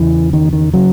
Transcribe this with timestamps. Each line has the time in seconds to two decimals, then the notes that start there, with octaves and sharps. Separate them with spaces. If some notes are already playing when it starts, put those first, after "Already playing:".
Already playing: E2 C#3 E3
0.33 D#3
0.53 D#3
0.74 C#3 F#3